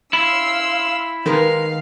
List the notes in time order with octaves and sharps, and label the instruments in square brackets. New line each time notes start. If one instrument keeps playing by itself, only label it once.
[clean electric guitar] E4 [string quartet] F5 C6 E6
[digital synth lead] D#3 [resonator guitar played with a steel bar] G#3 A#4 B4 [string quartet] F5